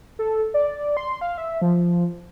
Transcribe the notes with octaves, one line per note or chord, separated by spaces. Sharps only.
A4
D5
C6
F5
E5
F3